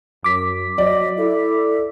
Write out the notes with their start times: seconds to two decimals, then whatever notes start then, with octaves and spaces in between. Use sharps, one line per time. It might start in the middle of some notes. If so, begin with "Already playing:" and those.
0.24 F#2 D6 B6
0.78 F#3 D5 D#5
1.18 E4 A4